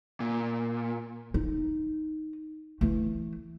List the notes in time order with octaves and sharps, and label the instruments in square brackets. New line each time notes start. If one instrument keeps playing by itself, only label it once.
[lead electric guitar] A#2
[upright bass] D#4
E3 A3